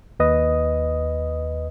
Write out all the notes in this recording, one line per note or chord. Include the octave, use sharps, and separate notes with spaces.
D#2 B4 D#5 D#6